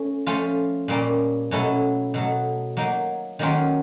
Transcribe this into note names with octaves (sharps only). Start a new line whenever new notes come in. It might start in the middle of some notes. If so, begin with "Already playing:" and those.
Already playing: A3 C#4
F3 A3 C#4 F4
A#2 G3 A#3 C#4
B2 F#3 A3 C#4 E4
B2 F#3 A3
F#3 A#3 D#4
D#3 F#3 A#3 C#4 F4